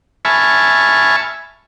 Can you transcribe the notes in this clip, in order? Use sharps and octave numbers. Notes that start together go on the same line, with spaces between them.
E5 G#5 A5 B5 C#6 F6